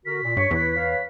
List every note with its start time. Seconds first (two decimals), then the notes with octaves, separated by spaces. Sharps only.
0.06 D3 F#4 A#4 B6
0.23 A#2
0.37 G2 C#5 C#6
0.51 E2 E4 B4 C#5
0.76 B4 C#5 F5